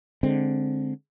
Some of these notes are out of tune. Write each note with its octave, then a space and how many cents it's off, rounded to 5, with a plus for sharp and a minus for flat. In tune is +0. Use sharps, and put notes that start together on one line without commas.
D3 +0 G#3 +0 C4 +5